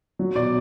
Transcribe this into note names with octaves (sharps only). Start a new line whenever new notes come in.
F#3
B2 D5